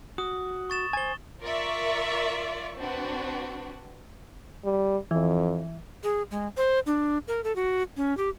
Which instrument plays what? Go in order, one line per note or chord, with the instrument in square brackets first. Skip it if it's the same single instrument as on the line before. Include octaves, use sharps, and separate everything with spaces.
[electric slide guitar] F#4 [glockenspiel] D#6
[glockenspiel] C#6 A6 E7
[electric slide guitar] C5 G#5 [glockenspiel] A6 G7
[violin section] F4 A#4 D5 E5 C#6
C4 D4 F#4 B4
[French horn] G3
[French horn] F2 [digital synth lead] E3
[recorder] G#4
G#3
C5
D4
A#4
A4
F#4
C#4
G4